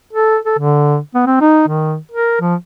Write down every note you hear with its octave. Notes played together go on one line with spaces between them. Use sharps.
A4
A4
D3
B3
C4
D#4
D#3
A#4
F3